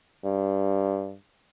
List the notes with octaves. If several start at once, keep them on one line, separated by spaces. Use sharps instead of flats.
G2